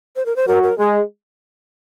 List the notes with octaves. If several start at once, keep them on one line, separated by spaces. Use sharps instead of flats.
C5
A#4
C5
F#3 A#4
A#4
G#3 G#4